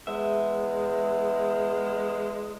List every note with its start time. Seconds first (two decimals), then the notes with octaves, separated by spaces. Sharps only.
0.07 E2 G#3 E5